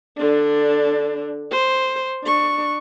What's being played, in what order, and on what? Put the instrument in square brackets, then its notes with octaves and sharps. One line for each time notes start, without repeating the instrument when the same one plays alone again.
[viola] D3 D4
C5
D4 C#6